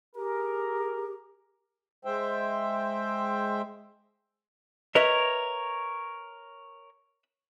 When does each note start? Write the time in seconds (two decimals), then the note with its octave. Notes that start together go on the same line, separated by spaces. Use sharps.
0.16 G4 G#4 A#4
2.05 G#3 C5 E5 G5
4.95 A#4 B4 C#5 D#5 E5